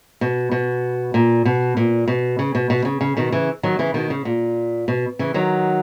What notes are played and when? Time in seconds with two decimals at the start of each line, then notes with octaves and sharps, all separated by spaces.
0.21 B2
0.51 B2
1.14 A#2
1.45 B2
1.77 A#2
2.08 B2
2.39 C#3
2.55 B2
2.70 B2
2.85 C#3
3.01 C#3
3.17 B2 D#3
3.32 C#3 E3
3.63 D#3 F#3
3.79 C#3 E3
3.94 B2 D#3
4.10 C#3
4.25 A#2
4.88 B2
5.19 C#3 E3
5.34 D#3 F#3